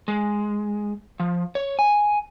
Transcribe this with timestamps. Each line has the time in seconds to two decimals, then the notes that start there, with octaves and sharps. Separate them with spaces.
0.08 G#3
1.20 F3
1.55 C#5
1.79 G#5